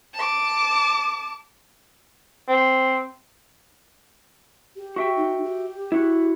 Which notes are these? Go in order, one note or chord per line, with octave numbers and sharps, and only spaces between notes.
A5 D6
C4
G4
F#4 E5 G5
D#4
G4
E4 F#4